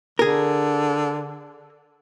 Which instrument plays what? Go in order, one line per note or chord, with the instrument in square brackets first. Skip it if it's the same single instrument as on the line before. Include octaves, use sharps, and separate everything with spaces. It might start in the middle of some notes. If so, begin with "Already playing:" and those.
[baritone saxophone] D3 [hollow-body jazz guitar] G#4 A#4